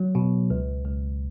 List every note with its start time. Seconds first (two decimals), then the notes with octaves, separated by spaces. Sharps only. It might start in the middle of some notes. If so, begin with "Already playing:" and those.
Already playing: F#3
0.15 B2
0.50 C#2
0.85 C#2